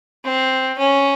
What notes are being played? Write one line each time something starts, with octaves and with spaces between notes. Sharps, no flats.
C4
C#4